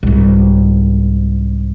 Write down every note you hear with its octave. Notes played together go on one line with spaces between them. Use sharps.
C2 G#2